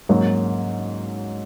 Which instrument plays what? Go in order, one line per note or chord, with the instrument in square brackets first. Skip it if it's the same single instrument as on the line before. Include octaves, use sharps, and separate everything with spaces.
[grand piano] G#2 F#3 A#3 C#4